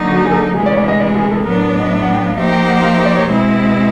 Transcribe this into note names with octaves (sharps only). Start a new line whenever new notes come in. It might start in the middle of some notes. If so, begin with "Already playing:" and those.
Already playing: D3 F#3 A#3 D#4
F#4
G#4
A4
D2 C3 E3 G#3 G#4
D5
C#5
D5
D#5
D5
G#4
A4
A2 F#3 B3 D4 A#4
A#4
C#5
D#5
E5
F#5
G5
F5
F3 A#3 D#4 G4 C5 E5
G5
F#5
F5
E5
D5
C#5
B2 G#3 C4 E4